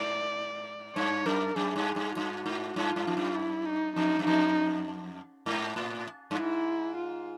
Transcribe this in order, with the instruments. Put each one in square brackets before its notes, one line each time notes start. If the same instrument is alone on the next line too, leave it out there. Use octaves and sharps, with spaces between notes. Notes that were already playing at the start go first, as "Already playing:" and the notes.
Already playing: [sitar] G#2 [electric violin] D5
[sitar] G2 [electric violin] C#5
[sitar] F#2 [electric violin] A#4
[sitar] F#2 [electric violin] G#4
[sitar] G2
G2
[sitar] G2 [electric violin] F#4
[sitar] G#2
[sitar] G2 [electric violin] F4
[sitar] G2
F2
F#2
[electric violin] E4
D#4
[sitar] F2 [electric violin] D#4
[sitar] F#2
[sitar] F2 [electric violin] D#4
[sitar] G#2
A2
G2
[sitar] G#2 [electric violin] E4
[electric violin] F4